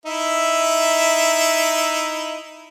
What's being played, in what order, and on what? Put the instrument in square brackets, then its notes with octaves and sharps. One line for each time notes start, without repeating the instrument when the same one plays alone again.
[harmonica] D#4 E4 E5